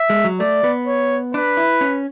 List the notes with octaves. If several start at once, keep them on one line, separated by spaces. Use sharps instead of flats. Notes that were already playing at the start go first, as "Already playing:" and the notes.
Already playing: E5
G#3
F#3
A3 D5
B3
C#5
D4 B4
E4
C#4